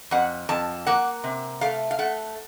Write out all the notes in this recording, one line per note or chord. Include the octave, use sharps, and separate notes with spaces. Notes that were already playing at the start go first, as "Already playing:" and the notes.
F2 F#5
F2 A5
A#3 F#5
C3
A3 F5
F5
A3 F#5